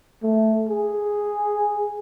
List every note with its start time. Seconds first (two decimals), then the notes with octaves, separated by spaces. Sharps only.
0.23 A3
0.69 G#4